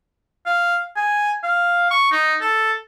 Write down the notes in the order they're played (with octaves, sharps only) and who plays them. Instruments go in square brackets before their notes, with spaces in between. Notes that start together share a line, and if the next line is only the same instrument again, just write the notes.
[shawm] F5
G#5
F5
C#6
D#4
A4